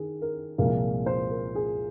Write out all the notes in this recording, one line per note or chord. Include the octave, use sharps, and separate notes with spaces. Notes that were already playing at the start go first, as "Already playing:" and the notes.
Already playing: D#3 G#4
A#4
C2 A#2 F3 G#3 A#3
C5
A#4
G#4